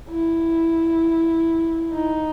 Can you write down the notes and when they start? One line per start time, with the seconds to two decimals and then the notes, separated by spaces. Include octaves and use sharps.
0.11 E4
1.93 D#4